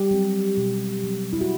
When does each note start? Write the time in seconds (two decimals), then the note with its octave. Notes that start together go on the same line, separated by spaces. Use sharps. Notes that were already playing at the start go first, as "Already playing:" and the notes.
Already playing: G3 G4
0.11 F#3 C4
0.57 B2
1.04 F#3 C4
1.33 E4
1.41 F#4